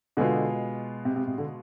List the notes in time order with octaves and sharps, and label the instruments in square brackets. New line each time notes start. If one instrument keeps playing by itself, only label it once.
[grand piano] B2 G#3 B3 F4 [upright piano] D3
[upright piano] C3
C3
C3
D3